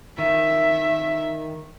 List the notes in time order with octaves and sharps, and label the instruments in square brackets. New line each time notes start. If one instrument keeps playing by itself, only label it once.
[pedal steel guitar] D#3 [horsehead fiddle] E5